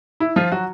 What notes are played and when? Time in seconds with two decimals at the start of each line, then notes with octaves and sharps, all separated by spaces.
0.20 E4
0.36 F3 F4
0.52 F#3 F#4